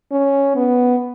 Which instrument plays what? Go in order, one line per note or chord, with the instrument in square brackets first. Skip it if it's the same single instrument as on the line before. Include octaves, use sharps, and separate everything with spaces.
[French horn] C#4
B3